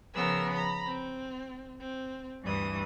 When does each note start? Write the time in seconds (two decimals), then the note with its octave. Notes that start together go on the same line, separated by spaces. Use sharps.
0.14 C#3 F3 B3 A#4 E6
0.50 A#5 B5
0.85 C4
1.80 C4
2.42 D2 G2 E3 D#6